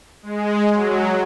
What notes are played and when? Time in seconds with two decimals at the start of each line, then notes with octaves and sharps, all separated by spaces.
0.22 G#3
0.72 F#3